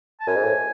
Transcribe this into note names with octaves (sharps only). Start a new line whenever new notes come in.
A5
F#2 G#5
G#2
A2